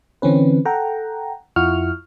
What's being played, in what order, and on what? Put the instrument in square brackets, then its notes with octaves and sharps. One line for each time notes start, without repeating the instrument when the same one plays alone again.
[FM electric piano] D3 E3 C4 C#4 B4
A4 F#5 G5 A#5
F2 E4 F4 F#5 C#6 F6